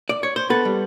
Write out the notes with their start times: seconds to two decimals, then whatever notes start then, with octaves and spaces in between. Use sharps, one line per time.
0.09 D5
0.23 C#5
0.36 C5
0.50 B3 A4 B4
0.65 G3